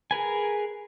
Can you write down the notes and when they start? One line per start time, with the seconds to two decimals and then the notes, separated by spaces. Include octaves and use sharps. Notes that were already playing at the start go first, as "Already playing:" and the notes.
0.11 G#4 A#4 B4 G#5